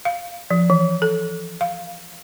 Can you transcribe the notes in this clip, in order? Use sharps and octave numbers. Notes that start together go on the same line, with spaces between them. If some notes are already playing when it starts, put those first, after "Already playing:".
F5
F3
E3
A4
F5